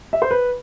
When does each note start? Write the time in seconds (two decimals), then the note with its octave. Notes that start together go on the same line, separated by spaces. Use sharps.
0.13 E5
0.22 C5
0.31 B4